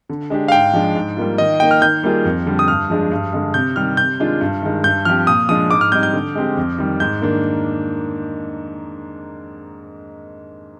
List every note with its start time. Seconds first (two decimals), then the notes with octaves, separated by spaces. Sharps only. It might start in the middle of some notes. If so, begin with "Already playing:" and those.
0.09 D3
0.30 G#3 D4 G4
0.48 F5
0.52 G#2 G5
0.74 F3 G#3 D4
0.95 G#2
1.17 G3 A#3 F4
1.38 D#3 D#5
1.60 A#3 D#4 G5
1.71 F6
1.82 D#3 G6
2.03 G3 A#3 F4 G#4
2.25 F2
2.46 D3 G3
2.59 D#6
2.68 G2 F6
2.90 F3 G#3 D4 G#4
3.11 G2
3.33 D3 G#3
3.54 C3 G6
3.76 D#3 G3 F6
3.97 C3 G6
4.20 D#3 G#3 D4 F4
4.41 G2
4.62 D#3 G#3
4.84 G2 G6
5.05 F3 C4 G4 F6
5.27 A#2 D#6
5.49 F3 G#3 D4 D#6
5.71 G#2 D6
5.81 F6
5.92 G3 C4 D#4 G6
6.03 G6
6.13 D3
6.35 G#3 C4 G4
6.57 F2
6.78 D#3 G3
7.00 G#2 G6
7.22 D#3 A#3 D4